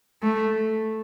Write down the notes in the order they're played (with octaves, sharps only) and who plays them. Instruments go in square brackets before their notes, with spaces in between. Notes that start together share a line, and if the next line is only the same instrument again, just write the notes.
[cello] A3